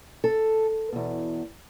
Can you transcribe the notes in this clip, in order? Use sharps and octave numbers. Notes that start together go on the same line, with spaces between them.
A4
E2 B2